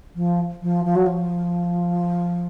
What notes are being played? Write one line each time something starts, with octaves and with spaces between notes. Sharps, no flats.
F3
F3
F3
F#3
F3